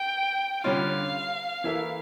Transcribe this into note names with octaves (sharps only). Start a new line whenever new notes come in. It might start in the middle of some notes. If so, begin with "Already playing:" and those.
Already playing: G5
D3 G3 C#4 F4 F5
E3 A#3 E4 A4